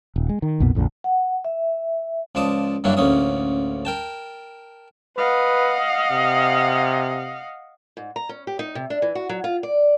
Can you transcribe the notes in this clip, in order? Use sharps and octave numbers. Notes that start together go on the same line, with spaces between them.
D#1
G#3
D#3
B1 F2 A#2 B3
A#1 F2 A#2 D3
F#5
E5
C#2 F3 D5 A5 D#6
G2 F#3 A#3 D4 E4
A1 D2 A#3 C#4 D#6
A#4 G5 A5
B4 D#5 F5 F#5
C3
G#2
A#5
C#4
G4
D#4
C3
D4
E3
F#4
F#3
F4
D5